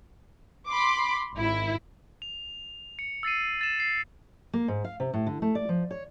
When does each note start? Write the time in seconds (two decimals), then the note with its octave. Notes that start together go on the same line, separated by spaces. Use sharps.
0.70 B5 C6 D6
1.37 G#1 E4
2.22 F7
2.99 C#7
3.23 E6 A6 C7 D#7
3.61 A6 E7
3.80 C7
4.53 A#3
4.68 G#2
4.84 F5
5.00 C3
5.13 A2
5.26 D3
5.42 A3
5.55 D5
5.69 F3
5.91 C#5